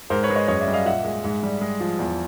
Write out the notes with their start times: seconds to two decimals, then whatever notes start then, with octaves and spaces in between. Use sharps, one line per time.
0.10 G#2 A#4 C5
0.23 B4 C#5
0.30 G#3
0.35 C#5 D#5
0.48 F#2 C#5 D#5
0.61 D5 E5
0.68 G3
0.73 D#5 F5
0.86 A#2 E5 F#5
1.04 G#3
1.24 G#2
1.43 G3
1.61 G#3
1.80 F3
1.99 E2